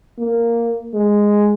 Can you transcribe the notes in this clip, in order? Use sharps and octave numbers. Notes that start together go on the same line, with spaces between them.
A#3
G#3